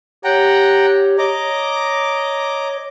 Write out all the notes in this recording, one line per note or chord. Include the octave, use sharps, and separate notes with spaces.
G4 C#5 F#5 G5 A#5
C#5 D#5 A#5 D6